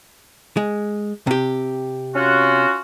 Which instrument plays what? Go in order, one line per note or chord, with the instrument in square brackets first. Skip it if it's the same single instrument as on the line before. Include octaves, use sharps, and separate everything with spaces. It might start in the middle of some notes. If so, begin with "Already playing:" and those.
[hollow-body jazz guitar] G#3
C3 G4
[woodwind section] C#4 F4 F#4